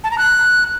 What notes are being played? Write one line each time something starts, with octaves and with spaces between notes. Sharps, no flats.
A5
A#5
F#6